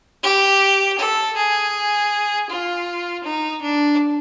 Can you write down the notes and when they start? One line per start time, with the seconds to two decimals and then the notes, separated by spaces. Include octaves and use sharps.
0.23 G4
0.98 A4
1.36 G#4
2.49 F4
3.24 D#4
3.62 D4